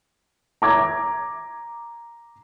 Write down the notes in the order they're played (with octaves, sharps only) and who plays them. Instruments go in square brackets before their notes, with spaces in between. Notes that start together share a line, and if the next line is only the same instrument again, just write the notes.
[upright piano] A#5 D6 G#6